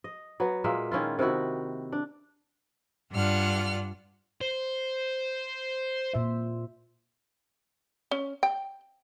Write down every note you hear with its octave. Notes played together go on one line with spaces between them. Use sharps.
D#5
F#3 B3
A#2 G#3 A#3 E5
D#3 C#4 E4 F4
C3 D#3 E4 F#4
D4
G2 D4 F4 F#5 F6
C5
A#2 C5 E5
C#4
G5